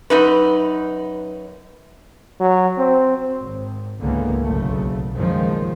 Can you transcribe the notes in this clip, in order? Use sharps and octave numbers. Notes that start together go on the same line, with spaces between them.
F#2 D#4 B4
F#3
C4
G#1
G#1 C#2 D3 E3 A#3 B3
F#1 B1 C#3 A3
F#1 E2 D#3 F3 G#3